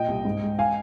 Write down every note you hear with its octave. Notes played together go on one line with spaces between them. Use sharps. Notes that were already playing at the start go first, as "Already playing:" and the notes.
Already playing: A#2 D#5 G5
C2
G#2
G#3
F5 G#5